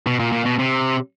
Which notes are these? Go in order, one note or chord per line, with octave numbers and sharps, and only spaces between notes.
B2
A#2
A#2
B2
C3